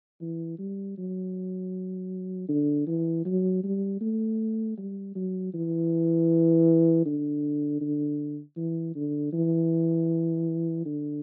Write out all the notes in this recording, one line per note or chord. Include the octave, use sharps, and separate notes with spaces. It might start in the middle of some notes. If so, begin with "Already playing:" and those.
E3
G3
F#3
D3
E3
F#3
G3
A3
G3
F#3
E3
D3
D3
E3
D3
E3
D3